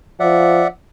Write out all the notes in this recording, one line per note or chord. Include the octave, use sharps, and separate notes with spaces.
F3 D5 E5 F#5